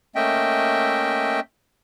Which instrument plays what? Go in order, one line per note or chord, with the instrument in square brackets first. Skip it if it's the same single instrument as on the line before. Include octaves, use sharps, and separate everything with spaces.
[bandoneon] A3 A#3 C#4 D#5 E5 G5